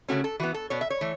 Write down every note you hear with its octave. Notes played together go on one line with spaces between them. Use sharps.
C#3 A3 C#4 F#4
A4
E3 B3 F#4
A4
B2 B3 C#5
E5
C#5
E3 A3